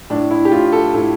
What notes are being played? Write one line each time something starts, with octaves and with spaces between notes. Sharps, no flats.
A2 D4
E4
G4
A2 F4
A4
A2 A4